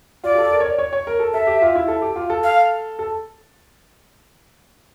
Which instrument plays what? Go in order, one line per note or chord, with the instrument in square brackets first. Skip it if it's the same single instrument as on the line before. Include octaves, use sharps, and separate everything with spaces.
[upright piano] F4 [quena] D5
[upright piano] G4
A4
A#4
C#5
D5
C#5
C#5
A#4
A4
[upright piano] A4 [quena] E5
[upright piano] G4
F4
E4
A4
G4
F4
A4
[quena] F5
[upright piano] A4